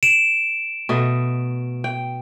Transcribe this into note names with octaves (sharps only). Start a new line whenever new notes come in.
D7 E7
B2 A3 D#5
G5